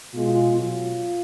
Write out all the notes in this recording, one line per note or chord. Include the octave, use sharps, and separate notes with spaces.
B2 G#3 F4
B2 F#3 F4